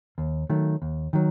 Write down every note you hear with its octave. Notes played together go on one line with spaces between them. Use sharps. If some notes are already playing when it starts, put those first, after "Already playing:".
D#2
D#3 F#3 A3
D#2
D#3 F#3